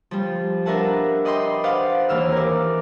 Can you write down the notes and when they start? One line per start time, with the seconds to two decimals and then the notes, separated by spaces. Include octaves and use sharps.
0.11 F3 G3
0.66 D4 A#4 B4 E5 F#5 A5
1.25 D5 D#5 G5 B5 C6 D#6
1.64 B4 C5 D5 F5 F#5
2.09 D#2 E3 E6 F6
2.32 A#4 D5